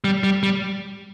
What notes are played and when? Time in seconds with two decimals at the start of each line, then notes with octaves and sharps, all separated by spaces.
0.04 G3
0.23 G3
0.43 G3